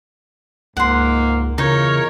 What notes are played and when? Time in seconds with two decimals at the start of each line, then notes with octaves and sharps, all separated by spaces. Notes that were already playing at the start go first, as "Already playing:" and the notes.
0.77 C#2 G#2 A#3 F#5 C6
1.58 E2 C#3 D#4 F4 A#4 C#5